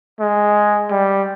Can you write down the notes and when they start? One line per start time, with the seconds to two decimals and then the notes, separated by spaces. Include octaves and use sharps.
0.20 G#3
0.91 G3